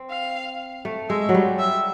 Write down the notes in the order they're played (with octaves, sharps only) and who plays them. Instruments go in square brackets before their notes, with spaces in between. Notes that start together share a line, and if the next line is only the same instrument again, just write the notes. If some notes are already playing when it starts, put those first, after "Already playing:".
Already playing: [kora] C4
[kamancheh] F5
[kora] A3
[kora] G#3 [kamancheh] E5
[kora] F#3
G3
[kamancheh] E5